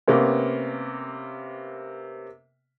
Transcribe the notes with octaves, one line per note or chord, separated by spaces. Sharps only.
C3 A#3 B3 C#4